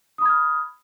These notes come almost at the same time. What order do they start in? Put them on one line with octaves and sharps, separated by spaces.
D#6 B5 G#6 F6